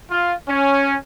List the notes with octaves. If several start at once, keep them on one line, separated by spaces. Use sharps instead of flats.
F4
C#4